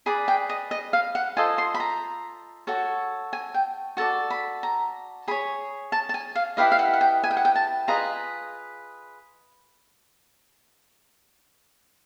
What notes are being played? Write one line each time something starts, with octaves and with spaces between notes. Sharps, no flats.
G#4 B4 D5 B5
G5
D#5
D#5
F5
F#5
F4 A4 C5 D#5 G#5
C6
B5
A#5
F#4 A4 C#5
G#5
G5
F#4 A4 D5 A5
B5
A#5
G#4 C#5 B5
A5
A5
G#5
F5
E4 G4 B4 D#5 F5
F5
F#5
F#5
G5
G#5
G5
F#5
G5
A5
F4 G#4 B4 D#5 A#5